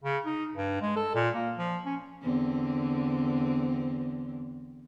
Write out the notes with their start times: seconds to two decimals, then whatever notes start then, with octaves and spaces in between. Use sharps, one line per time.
0.04 C#3
0.26 D#4
0.55 G2
0.82 G#3
0.96 A4
1.15 A#2
1.35 A#3
1.58 F3
1.85 C#4
2.22 E2 D3 C4